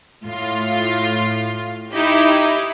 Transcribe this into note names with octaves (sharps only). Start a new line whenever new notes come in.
A2 F4
D#4 E4 G4